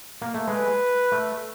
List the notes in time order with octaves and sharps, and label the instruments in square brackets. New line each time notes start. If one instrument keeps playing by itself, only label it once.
[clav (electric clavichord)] A#3
A3
[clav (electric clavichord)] G#3 [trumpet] B4
[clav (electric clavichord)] A3